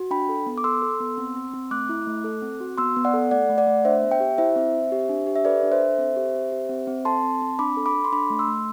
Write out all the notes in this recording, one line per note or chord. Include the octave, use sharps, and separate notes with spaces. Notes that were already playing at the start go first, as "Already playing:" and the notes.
Already playing: F#4
D4 G5 B5
A4
B3
D6
A4 C6 E6
A4
B3
C4
C4
C4
A3 D6 F#6
E4
A3
A4
C4
F#4
B3 C6 E6
B3
D5 F#5
A4
A3 D5 F#5
A3
D5 F#5
A3
D4 C5 E5
B3
E5 G5
G4
E4 C5 E5
C4
C4
G4
D4
G4
E5
A4 B4 D5
D4
C5 E5
A4
C4
G4
C4
G4
C4
C4
A4 A5 C6
C4
C4
D4 B5 D6
A4
B5 D6
A4
C6
D4 B5 D6
A3
C6 E6
A3